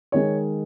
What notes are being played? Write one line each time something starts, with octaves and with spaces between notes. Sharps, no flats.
D#3 G#3 C#5